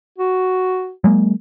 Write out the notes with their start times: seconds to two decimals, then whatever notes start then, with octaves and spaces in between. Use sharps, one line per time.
0.18 F#4
1.04 F#3 G#3 A#3